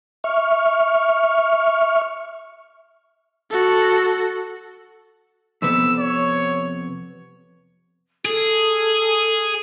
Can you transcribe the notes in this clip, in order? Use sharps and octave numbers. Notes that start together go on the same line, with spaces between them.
E5 C#6 F6
F#4 A4
F2 C3 B3 E6
C#5
G#4 A4